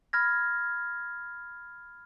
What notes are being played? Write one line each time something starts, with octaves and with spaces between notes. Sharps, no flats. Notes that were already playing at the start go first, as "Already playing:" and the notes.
B5 F6 G#6 A#6